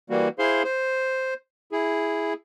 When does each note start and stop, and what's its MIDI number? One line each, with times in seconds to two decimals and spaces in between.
0.10 0.28 52
0.10 0.28 55
0.10 0.28 58
0.10 0.28 66
0.39 0.63 64
0.39 0.63 68
0.39 0.63 72
0.39 0.63 77
0.39 0.63 84
0.64 1.34 72
1.72 2.33 64
1.72 2.33 68